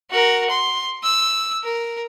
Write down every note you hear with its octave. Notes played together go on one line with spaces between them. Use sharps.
F#4 A#4
C6
E6
A#4